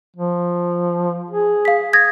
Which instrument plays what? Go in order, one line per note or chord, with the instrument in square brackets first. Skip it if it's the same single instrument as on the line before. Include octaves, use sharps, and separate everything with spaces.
[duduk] F3
G#4
[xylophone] F5 B6
D#6 G#6 A#6